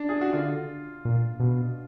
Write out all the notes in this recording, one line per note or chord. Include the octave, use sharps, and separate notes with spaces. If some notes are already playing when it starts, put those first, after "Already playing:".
Already playing: D4
G#4
F#4
D3 F4
A#2
B2